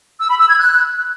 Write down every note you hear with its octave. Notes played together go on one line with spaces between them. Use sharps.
E6
B5
E6
G#6
F#6